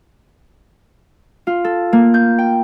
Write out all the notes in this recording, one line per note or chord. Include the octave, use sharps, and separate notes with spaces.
F4
A4
A#3
G6
G5